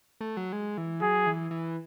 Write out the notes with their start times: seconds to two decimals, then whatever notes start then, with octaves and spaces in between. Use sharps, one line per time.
0.21 A3
0.37 F#3
0.52 G#3
0.78 E3
1.02 F#3 G#4
1.27 E3
1.51 E3